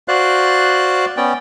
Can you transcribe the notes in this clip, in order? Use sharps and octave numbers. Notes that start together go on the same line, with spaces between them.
F#4 C5 D5 F5 F#6
B3 C#4 D5 G5